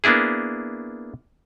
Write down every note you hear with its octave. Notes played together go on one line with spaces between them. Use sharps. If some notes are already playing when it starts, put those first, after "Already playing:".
A#3 B3 D4 E4 G#4